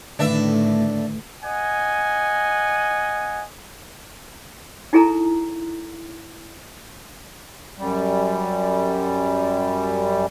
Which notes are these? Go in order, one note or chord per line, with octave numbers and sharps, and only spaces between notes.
A2 D3 D#3 A3 D4 B4 E5
D#5 F#5 G#5
D#4 E4 G#4 A4 A#5
F#2 G3